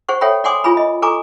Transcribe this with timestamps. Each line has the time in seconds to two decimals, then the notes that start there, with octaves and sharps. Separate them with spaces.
0.09 G#4 C5 F#5 C#6
0.21 A4 C#5 E5 F#5 G5 B5
0.44 D5 F#5 G#5 C6 D6 D#6
0.64 F4 G#4 G#5 B5
0.77 D#5
1.02 A4 G#5 A#5 C#6 D6